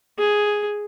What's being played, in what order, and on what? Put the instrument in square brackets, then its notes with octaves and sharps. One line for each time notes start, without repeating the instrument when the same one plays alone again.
[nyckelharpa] G#4